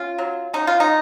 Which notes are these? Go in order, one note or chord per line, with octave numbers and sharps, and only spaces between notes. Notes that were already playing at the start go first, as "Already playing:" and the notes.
Already playing: C#4 F4
F#3
C#4 D#4
F4
D#4